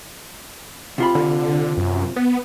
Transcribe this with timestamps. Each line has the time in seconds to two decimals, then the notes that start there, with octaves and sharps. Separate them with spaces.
0.98 C3 F4 B5
1.15 D3
1.77 F#2
2.16 B3